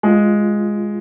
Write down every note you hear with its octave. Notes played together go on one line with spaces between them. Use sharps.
G#3 F4